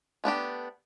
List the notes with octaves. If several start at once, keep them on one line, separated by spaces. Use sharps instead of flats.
A3 B3 D4 G4